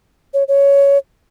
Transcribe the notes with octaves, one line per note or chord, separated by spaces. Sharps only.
C#5
C#5